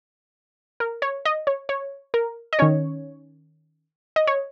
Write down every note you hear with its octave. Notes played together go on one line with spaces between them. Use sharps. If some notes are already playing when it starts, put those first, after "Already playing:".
A#4
C#5
D#5
C#5
C#5
A#4
D#5
D#3 C#4 C#5
D#5
C#5